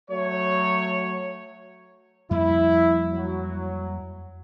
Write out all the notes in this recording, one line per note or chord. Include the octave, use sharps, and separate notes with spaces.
F#3 A3 C#5
F2 G3 A#3 E4
F#3